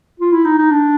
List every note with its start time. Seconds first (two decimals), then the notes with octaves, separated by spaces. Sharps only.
0.20 F4
0.32 E4
0.45 D#4
0.58 D#4
0.71 D4